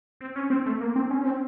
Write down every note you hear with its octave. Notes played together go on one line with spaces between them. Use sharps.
C4
C#4
C4
A3
A#3
C4
C#4
C#4
C4